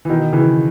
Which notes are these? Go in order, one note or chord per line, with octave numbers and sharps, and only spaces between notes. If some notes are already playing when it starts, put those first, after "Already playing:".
E3
B2 D#3
C#3 E3